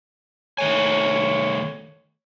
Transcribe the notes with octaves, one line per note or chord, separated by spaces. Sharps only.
D#3 A3 C#5 G#5